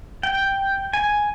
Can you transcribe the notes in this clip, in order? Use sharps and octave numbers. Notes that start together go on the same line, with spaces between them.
G5
G#5